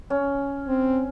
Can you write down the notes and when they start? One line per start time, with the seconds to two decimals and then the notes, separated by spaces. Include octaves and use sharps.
0.10 C#4
0.68 C4